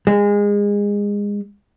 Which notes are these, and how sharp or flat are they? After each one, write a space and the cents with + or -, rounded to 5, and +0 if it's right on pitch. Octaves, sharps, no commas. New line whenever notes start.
G#3 -25